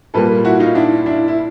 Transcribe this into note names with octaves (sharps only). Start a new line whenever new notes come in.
A#2 G3 A#3 A4 B4
E4 F#4
D#4 F4
D4 E4
D4 E4
E4